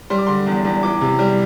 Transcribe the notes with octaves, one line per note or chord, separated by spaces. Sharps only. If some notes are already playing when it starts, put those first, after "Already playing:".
G3 C6
D6
D3 C6
E2
E2
E3 D6
C3
G3